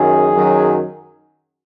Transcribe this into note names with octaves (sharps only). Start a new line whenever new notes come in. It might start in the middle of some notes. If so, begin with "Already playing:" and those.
Already playing: F#2 D#3 F#3 G#4
F#2 D#3 F#3